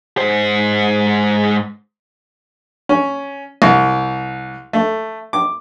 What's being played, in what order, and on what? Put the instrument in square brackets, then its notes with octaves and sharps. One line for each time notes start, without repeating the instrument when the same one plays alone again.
[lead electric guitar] G#2 C5
[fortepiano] C#4
C2
A3
D6